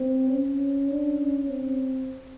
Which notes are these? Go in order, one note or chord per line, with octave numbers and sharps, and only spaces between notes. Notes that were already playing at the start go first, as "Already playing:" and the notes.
Already playing: C4
C#4
D4
C#4
C4